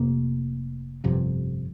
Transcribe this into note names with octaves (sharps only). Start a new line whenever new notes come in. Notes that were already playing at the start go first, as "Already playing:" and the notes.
Already playing: F1 F2 C3 A#3
G1 F2 C3